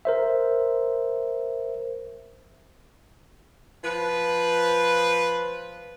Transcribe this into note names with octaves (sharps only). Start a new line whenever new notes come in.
A#4 C5 E5
F3 B4